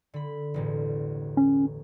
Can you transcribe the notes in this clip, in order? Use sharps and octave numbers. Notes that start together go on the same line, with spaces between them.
D3 B5
E1 A1 A2
C#4